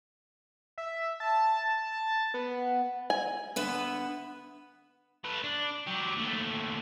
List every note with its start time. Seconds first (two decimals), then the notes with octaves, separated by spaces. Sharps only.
0.78 E5
1.20 A5
2.34 B3
3.10 G#5
3.56 D3 B3 B4 E5
5.24 A3 B4
5.44 D4
5.86 F#3 G4
6.17 D#2 A3